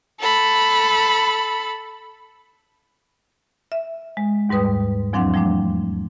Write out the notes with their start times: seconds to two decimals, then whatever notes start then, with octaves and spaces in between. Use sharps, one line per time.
0.21 A4 B5
3.72 E5
4.17 G#3
4.49 D#2 G#2 G3 B4 D#6
5.13 E2 F3 F#3 C4 D4 F#5
5.34 F3 G3 A3 D4